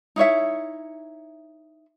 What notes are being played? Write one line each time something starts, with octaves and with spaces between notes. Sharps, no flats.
D#4 E4 C#5 E5